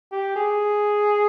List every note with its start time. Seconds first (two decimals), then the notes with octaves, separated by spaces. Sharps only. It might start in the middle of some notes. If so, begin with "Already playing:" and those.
0.12 G4
0.36 G#4